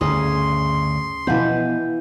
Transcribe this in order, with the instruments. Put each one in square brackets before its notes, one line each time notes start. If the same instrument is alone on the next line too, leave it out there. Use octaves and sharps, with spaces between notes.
[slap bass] D2 G2 C#3 [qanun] C#4 G#4 [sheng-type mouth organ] C6 [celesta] D#6
[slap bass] B2 F3 B3 [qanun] E3 B5 [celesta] F5 F#5 G6